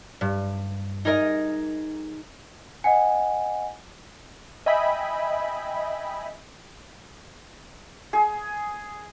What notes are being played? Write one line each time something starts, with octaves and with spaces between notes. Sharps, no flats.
G2
D#4 G#4 A#4 D#5
D#5 F#5 G#5
D#5 E5 G5 G#5 B5
G#4